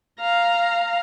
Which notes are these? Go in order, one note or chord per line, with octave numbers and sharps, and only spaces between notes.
F5 A#5